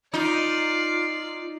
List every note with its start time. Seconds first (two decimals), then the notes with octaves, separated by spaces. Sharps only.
0.14 D#4 F4 D5 C7